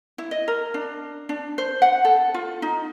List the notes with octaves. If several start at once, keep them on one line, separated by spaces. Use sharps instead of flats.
E4
D#5
A#4
D4
D4
C5
F#5
A4
F4
D#4